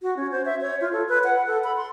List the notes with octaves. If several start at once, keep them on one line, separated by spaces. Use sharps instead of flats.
F#4
C#4
C5
E5
C#5
F4
A4
B4
F#5
A4
B5
C6